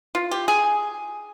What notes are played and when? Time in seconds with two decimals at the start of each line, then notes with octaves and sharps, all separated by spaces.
0.15 F4
0.31 G4
0.48 G#4